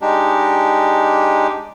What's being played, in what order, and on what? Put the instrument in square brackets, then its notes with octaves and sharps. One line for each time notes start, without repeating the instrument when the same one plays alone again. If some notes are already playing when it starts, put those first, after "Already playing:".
[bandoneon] G#3 D4 D#4 G4